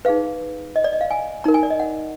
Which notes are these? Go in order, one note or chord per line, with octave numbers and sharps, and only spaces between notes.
D#4 G#4 B4 F5
D#5
D5
D#5
F5
G#5
D#4 A#4 A#5
G#5
D5
D#5
F#5